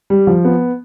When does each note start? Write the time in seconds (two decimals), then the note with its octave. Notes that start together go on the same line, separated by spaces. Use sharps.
0.10 G3
0.27 F3
0.45 B3